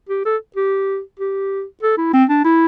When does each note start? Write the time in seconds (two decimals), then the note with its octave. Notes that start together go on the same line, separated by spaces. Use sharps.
0.09 G4
0.25 A4
0.56 G4
1.19 G4
1.83 A4
1.97 E4
2.13 C4
2.29 D4
2.44 E4